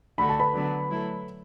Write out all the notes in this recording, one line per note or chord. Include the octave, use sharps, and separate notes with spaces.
D3 A3 F#4 A4 B5
A5
B4 B5
D3 F#3 B3 D4
F#3 A3 E4 A4